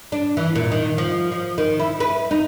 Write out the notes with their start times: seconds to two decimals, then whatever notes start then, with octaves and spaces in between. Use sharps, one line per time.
0.12 D4
0.37 E3
0.55 A#2
0.72 D#3
0.98 F3
1.32 F3
1.58 D#3
1.80 E4
2.00 B4
2.31 D#4